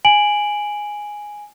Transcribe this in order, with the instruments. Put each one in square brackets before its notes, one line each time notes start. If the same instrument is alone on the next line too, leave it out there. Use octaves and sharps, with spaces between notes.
[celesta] G#5 D7 F#7